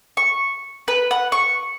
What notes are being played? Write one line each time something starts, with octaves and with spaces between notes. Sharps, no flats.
C#6
B4
F#5
C#6